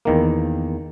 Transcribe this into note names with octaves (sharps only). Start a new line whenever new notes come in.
E2 D#3 A#3